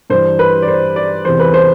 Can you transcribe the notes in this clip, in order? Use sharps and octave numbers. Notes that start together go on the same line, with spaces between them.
G2 E3 C5
B4
D5
C5
D5
E2 C3 E3 C5
B4
C5